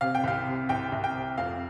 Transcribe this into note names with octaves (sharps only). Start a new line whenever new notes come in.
C3 F5
G5
C2 F5
C3
C2 G5
C2
G5
C3
F2 F5